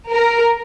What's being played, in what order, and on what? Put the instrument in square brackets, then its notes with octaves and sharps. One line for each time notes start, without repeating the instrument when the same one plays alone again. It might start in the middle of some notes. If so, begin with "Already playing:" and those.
[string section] A#4